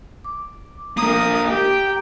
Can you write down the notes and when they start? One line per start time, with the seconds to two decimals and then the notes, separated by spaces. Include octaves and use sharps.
0.24 D6
0.97 A#3 D4 A#4 A#5 D#6
1.48 G4 G5